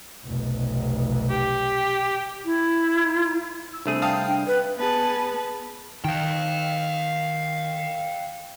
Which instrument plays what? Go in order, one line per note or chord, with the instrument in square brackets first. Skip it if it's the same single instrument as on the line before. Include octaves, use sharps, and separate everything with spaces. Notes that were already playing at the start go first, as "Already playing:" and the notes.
[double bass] F1 B1
[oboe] G4
[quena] E4
[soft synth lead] E6
[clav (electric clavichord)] C2 A3 G#4 [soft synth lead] D4
[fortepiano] F5 A5 D#6 [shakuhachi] G5
[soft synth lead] D4
[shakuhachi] B4 [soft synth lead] G5
[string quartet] B3 G#4 B4 A5
[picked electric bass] D#3 [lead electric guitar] F5 G5